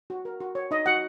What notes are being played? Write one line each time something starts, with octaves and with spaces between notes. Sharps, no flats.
F#4
A#4
F#4
C#5
D#4 D#5
F#4 F#5